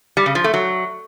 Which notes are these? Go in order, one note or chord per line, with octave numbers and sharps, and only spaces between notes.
G3
C#3
F3
A3
F#3